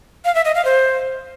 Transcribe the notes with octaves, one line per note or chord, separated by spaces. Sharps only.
F5
E5
D#5
F5
C5